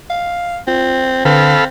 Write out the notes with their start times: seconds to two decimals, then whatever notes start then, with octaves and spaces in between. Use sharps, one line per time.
0.10 F5
0.68 C4 F4
1.25 D3 C4 A4 B4 F5 B5